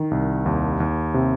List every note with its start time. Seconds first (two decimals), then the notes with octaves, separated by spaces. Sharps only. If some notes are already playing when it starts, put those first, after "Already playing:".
Already playing: D#3
0.11 C2
0.46 D#2
0.80 D#2
1.14 C3